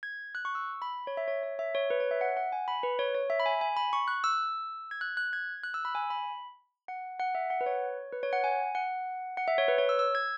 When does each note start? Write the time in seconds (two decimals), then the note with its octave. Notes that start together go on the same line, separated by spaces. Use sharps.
0.03 G#6
0.35 F#6
0.45 C#6
0.55 E6
0.82 B5
1.07 C#5
1.17 E5
1.28 C#5
1.43 C#5
1.59 E5
1.75 C#5
1.90 B4
2.00 C#5
2.11 E5
2.21 F#5
2.37 F#5
2.52 G#5
2.68 B5
2.83 B4
2.99 C#5
3.15 C#5
3.30 E5
3.40 B5
3.46 G#5
3.61 G#5
3.77 B5
3.93 C#6
4.08 F#6
4.24 E6
4.91 G#6
5.01 F#6
5.17 F#6
5.33 G#6
5.64 F#6
5.74 E6
5.85 B5
5.95 G#5
6.10 B5
6.88 F#5
7.19 F#5
7.35 E5
7.50 F#5
7.61 B4
7.66 C#5
8.13 B4
8.23 C#5
8.33 F#5
8.44 G#5
8.75 F#5
9.37 F#5
9.48 E5
9.58 C#5
9.68 B4
9.78 C#5
9.89 E6
9.99 E6
10.15 G#6